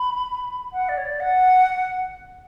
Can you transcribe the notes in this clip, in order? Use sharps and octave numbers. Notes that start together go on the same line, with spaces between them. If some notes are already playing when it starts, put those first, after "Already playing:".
Already playing: B5
F#5
D5
C#5
D5
F#5